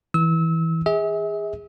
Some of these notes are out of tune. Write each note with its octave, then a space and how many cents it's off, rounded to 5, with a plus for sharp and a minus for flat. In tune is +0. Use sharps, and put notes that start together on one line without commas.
E3 -15 E6 -30
G#4 -20 E5 -40